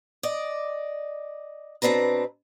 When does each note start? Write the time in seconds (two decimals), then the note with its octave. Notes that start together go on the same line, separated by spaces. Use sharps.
0.23 D5 D#5
1.82 B2 C4 D4 B4 A#5